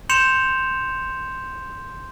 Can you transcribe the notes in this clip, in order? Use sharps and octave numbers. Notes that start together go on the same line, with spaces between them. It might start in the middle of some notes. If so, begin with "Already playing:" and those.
C6 G6 C#7 E7 F7